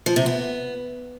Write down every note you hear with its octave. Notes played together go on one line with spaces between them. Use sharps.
F3
C3
B3